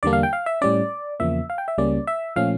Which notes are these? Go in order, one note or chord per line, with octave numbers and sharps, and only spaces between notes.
E2 D3 G3 A#3 D4 D5
F5
G5
F5
E5
A2 G3 C#4 D5
E2 C#3 F3 A#3 E5
F5
G5
E5
C#2 C#3 G3 A#3 C#4 D5
E5
A#2 F3 A3 C#4 F5